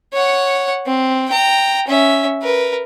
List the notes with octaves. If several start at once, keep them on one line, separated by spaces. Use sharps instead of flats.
C#5 F#5
C4
G5 A#5
C#4 E5
A#4 B4